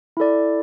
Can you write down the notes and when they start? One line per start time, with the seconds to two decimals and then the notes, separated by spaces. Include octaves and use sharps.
0.17 E4 A4 D5